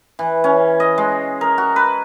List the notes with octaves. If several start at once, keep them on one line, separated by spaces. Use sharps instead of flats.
E3
C#4
D#5
G#3
A#4
F#4
B4